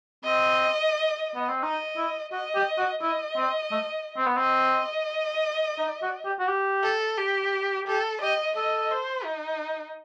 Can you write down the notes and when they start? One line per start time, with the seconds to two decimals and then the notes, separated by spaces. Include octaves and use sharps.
0.24 C4 D#5
1.35 B3
1.49 C4
1.63 D#4 D#5
1.97 E4
2.32 F#4 D#5
2.55 G4
2.78 F#4
3.02 E4 D#5
3.36 C4
3.71 A3
4.17 C4
4.27 B3
4.37 C4 D#5
5.78 D#4
6.03 F#4
6.25 G4
6.40 F#4
6.48 G4
6.83 A4
7.17 G4
7.87 G4 A4
8.21 G4 D#5
8.56 A4 D#5
8.91 C5
9.25 D#4